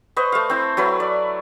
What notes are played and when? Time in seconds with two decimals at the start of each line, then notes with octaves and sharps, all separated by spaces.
0.16 B4 C5 D#5 C#6
0.32 A3 F5
0.50 C4 E4
0.77 F#3 E4 B4
1.00 D5